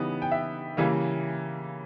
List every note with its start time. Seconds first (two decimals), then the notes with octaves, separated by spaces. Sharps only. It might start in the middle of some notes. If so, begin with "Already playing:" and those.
Already playing: C#3 E3 G3 B3 D#4
0.22 G5
0.32 E5
0.77 C#3 E3 G3 A#3